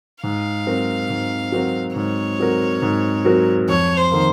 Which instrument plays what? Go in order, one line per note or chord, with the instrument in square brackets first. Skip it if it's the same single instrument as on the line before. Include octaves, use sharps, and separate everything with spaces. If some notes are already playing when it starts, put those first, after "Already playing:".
[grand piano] G#2 [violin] F5
[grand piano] F#3 C4 F#4 A#4
G#2
F#3 C4 F#4 A#4
[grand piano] G#2 [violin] C#5
[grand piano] F#3 C4 F#4 A#4
G#2
F#3 C4 F#4 A#4
[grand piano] F2 [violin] C#5
[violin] C5
[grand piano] D#3 A#3